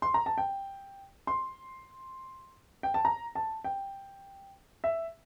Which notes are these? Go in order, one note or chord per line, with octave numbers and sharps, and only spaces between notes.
C6
A#5
A5
G5
C6
G5
A5
A#5
A5
G5
E5